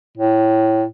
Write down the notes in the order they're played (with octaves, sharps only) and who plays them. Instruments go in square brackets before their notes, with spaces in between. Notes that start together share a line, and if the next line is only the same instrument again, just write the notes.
[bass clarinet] A2